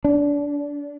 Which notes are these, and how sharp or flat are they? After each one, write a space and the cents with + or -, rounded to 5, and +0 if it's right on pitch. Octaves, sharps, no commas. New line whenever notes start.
D4 -25